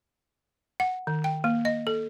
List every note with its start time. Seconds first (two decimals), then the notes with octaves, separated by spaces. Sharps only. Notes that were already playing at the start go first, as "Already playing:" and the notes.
0.80 F#5
1.07 D#3
1.24 G5
1.44 A#3
1.65 D#5
1.87 A4